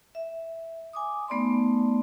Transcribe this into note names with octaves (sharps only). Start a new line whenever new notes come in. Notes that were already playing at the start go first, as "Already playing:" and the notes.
E5
G#5 D6 D#6
A3 B3 D#4 D5 A5 C6